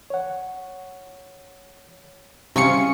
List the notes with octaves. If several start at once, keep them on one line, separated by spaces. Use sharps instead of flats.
C#5 F#5
C3 G3 C#4 E4 F4 G#4 C#7